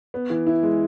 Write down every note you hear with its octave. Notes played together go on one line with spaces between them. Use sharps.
B3
E3
E4
G#3